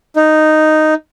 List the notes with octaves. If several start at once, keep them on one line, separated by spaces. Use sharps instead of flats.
D#4